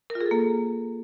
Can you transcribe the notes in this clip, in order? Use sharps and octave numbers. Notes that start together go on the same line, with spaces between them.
A#4
F4
G#4
A4
A#3